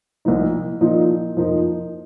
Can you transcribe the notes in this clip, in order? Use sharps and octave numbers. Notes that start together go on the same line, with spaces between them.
C2 A#2 F3 D#4
A#2 F3 D#4
F2 F3 A#3 D#4